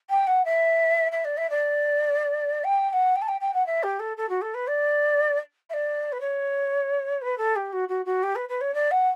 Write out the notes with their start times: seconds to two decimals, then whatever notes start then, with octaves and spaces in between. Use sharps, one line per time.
0.10 G5
0.27 F#5
0.45 E5
1.12 E5
1.24 D5
1.37 E5
1.50 D5
2.64 G5
2.90 G5
2.93 F#5
3.16 G5
3.21 A5
3.28 G5
3.41 G5
3.54 F#5
3.66 E5
3.83 G4
3.99 A4
4.17 A4
4.29 F#4
4.41 A4
4.54 B4
4.67 D5
5.69 E5
5.73 D5
6.12 B4
6.20 C#5
7.21 B4
7.38 A4
7.55 G4
7.72 F#4
7.88 F#4
8.05 F#4
8.23 G4
8.35 B4
8.49 B4
8.61 C#5
8.74 D5
8.91 F#5